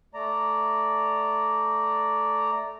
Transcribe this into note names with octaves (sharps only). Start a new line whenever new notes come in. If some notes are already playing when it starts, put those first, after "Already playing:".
A3 D5 A#5